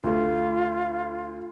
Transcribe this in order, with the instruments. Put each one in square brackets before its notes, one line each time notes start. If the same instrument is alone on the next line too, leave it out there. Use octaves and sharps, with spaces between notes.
[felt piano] D2 A3 [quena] F4